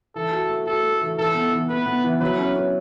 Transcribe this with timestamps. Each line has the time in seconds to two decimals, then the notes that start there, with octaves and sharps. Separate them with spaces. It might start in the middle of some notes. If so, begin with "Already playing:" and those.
0.15 E3 A4
0.32 F#4
0.49 A3
0.66 F#4 A4
0.83 A3
1.01 E3
1.18 E3 A4
1.35 B3
1.53 E3
1.69 B3 B4
1.86 B3
2.04 E3
2.21 F#3 B4
2.38 C#4
2.56 C#4